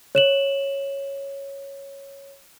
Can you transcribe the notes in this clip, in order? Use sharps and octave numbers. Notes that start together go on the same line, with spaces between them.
C#5 E7 F#7